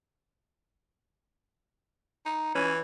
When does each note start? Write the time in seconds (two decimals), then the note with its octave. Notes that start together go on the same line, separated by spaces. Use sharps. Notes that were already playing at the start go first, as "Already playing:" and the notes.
2.26 D#4
2.55 E3 C#4